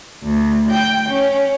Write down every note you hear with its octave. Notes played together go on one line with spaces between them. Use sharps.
D2
G5
C#4